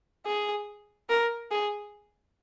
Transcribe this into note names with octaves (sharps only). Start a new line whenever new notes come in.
G#4
A#4
G#4